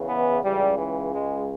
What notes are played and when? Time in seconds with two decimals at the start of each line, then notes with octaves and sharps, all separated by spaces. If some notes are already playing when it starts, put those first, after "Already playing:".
Already playing: E2 C#3 E3
0.09 B3
0.44 C#2 C#3 E3 G3
0.78 E3
1.12 G#3